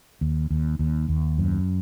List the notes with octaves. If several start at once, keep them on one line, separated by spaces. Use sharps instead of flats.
D#2
D#2
D#2
D#2
F#2